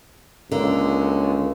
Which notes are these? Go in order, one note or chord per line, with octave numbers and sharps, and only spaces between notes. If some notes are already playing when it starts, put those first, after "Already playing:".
C#2 D3 A#3